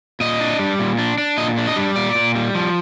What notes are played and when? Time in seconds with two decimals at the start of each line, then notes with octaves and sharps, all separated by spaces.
0.20 A#2 D#5
0.40 D4
0.59 G3
0.79 A#2
0.99 D4
1.18 D4
1.38 A#2 D#5
1.58 D4
1.67 D#5
1.76 G3
1.96 A#2 D5
2.15 A#2
2.35 G3
2.55 F3